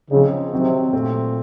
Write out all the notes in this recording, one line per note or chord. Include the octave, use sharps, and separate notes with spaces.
C#3 F3 C4 D#4
C3 D#3 F#3 C4 F#4
A#2 A3 C4 F4